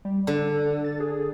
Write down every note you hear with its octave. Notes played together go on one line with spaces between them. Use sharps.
G3
D3 A4
A6
G#4